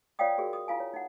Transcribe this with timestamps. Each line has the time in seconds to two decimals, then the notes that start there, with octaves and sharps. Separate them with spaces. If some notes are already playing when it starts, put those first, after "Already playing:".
0.19 F4 C#5 D5 F5 G5 D#6
0.38 F#4 G#4 A#4
0.53 D#6
0.68 E4 F4 F5 G#5
0.80 C#5
0.94 D#4 F#5